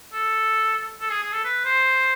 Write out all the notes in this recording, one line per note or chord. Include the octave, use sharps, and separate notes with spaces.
A4
A4
G#4
G#4
A4
B4
C5